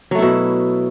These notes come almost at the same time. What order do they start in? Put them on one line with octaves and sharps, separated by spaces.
F#3 A3 E4 B2